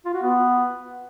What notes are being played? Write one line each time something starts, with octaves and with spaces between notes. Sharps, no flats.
F4
F#4
B3